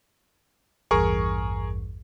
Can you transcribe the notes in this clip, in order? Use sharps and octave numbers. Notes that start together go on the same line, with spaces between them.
A1 E2 G2 G#4 A#4 C#6